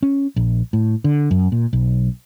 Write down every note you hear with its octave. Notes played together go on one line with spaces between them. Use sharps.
C#4
A#1
A2
D3
F#2
A#2
B1